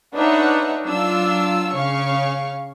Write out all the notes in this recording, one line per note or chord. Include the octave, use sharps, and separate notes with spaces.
D4 D#4 B4 C#5 E5 F#5
F#3 D4 F4 E6
C#3 C#5 F5 C#6